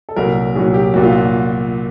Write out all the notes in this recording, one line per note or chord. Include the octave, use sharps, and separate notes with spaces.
A4
C2 A#2 F#3 A#4
C2 A#2 F#3 G#4
G4
C2 A#2 F#3 F#4
F4
F#4